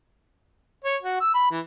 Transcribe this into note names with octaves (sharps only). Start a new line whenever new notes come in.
C#5
F#4
E6
B5
E3